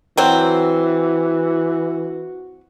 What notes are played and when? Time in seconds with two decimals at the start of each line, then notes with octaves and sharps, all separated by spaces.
0.17 E3 F#3 C4 F#4